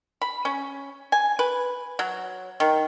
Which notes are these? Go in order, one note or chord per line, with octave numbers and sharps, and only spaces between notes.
B5
C#4
G#5
B4
F#3
D#3